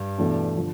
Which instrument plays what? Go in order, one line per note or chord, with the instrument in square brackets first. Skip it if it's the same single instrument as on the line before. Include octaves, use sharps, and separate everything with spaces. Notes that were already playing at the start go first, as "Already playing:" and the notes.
Already playing: [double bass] G2
[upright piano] E2 B2 A3 D4
D3 F3